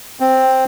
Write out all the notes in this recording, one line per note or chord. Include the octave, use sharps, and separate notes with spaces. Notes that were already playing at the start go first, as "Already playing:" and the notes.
C4